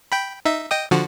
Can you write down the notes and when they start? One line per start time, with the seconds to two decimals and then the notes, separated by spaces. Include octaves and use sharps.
0.12 G5 B5
0.45 D#4 E5
0.71 D#5 G5 D#6
0.91 D3 F3 F#4